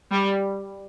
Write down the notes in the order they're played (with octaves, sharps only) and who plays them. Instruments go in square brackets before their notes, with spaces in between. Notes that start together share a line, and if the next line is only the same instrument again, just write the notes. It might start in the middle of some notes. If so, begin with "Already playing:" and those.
[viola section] G3